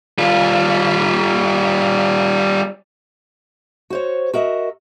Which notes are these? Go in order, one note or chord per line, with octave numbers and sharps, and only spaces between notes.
G3 F4
F#4 C5 C#5
F#4 A#4 D#5 E5